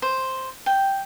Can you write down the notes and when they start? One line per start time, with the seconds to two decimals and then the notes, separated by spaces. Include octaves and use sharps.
0.02 C5
0.66 G5